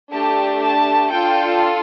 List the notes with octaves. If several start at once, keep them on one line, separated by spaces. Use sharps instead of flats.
A3 D4 G4 A5
A5
D4 F4 A4 G5